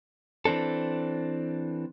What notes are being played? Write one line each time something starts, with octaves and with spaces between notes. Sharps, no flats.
E3 C4 D4 A4